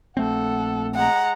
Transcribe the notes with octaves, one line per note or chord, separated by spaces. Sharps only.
A#1 A3 C4 A4 F#5
G#3 F#5 A#5